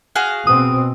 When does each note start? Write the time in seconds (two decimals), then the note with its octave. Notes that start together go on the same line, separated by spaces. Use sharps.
0.15 F#4 G#4 F5
0.47 B2 C4 D#6